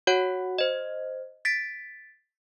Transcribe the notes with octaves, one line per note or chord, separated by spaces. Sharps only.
F#4 C#5 F#5
C5 D#5
A6 B6 D7